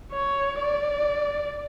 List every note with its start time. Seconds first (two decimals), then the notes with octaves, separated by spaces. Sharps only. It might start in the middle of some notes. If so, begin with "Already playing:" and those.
0.13 C#5
0.61 D5